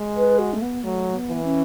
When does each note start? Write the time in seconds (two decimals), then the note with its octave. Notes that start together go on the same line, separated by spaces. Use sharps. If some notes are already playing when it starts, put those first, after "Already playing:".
Already playing: G#3
0.16 B4
0.39 F#4
0.54 A3
0.62 B3
0.84 F#3 A3
1.14 B3
1.29 E3
1.44 C#4